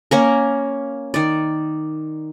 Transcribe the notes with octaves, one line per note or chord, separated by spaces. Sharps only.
A#3 C#4 A#4
D#3 D5